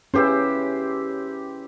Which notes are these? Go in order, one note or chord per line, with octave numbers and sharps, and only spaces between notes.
C#4 E4 G4 G#4 B4 C5